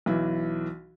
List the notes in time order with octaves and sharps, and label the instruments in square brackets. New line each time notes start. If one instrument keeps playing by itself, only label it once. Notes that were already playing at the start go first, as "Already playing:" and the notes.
[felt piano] B1 E3